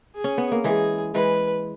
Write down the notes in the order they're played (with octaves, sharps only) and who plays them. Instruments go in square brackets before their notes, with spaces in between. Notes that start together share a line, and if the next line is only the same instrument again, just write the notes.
[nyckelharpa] G#4
[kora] C#4
B3
A#3
[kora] E3 G#3 [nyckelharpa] G#4
[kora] E3 G#3 [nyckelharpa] B4